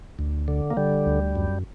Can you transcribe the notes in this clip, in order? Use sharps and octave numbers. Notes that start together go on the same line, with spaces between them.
D2
D3
A#3
D3 G3
D2
F#2